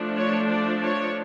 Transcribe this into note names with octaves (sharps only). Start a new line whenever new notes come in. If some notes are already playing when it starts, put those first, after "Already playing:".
Already playing: F3 A3 D4
C#5
D5
C#5